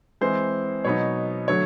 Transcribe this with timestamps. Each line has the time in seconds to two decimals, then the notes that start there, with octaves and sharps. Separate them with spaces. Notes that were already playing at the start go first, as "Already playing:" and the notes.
0.21 E3 G#3 C4 C5
0.85 B2 F#3 B3 D#4 C#5
1.48 D3 F#3 A3 C#5